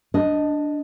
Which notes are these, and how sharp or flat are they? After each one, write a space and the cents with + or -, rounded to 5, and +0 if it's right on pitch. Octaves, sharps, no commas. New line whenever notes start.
D4 +0 D#5 +0